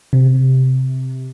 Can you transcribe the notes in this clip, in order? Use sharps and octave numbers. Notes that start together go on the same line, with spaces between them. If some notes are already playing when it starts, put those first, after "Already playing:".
C3